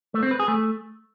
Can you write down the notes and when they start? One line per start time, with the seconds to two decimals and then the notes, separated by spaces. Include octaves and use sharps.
0.14 A3
0.23 C4
0.31 B4
0.40 G#4
0.48 A3